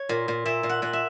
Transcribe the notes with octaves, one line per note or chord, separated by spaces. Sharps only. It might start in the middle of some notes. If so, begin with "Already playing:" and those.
Already playing: C#5
A#2
A#2
A#2 E5
A#2
F#5
A#2 F#5
E5